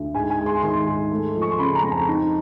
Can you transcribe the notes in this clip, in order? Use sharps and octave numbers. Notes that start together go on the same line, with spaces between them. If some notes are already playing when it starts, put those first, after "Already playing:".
Already playing: D2
G#2 G#5
G#5
G#3
C6
D#3 C6
G#2
A3
F3
C#6
C6
C#3 B5
A#5
F2
A5
D#4